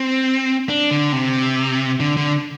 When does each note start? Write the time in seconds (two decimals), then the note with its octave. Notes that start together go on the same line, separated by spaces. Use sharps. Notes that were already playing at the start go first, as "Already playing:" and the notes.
Already playing: C4
0.69 D4
0.91 D3
1.12 C3
2.00 D3
2.17 D3